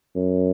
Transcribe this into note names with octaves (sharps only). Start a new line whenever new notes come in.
F#2